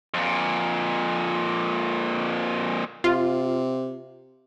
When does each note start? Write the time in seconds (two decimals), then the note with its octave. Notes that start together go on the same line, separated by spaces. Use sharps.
0.14 F2 A#2
3.04 C3 F4